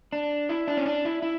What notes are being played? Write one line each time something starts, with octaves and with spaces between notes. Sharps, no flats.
D4
E4
D4
C#4
D4
E4
E4